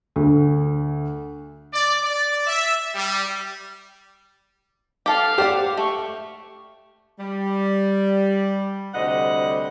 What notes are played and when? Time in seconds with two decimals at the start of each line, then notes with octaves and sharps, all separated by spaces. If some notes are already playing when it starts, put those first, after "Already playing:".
0.16 D2
1.73 D5
2.03 D5
2.47 E5
2.95 G3
5.06 G4 A4 F5 A5
5.38 G4 C5 D5 F#5
5.77 A3 C#6
7.19 G3
8.94 D2 C3 G3 D#5 F#5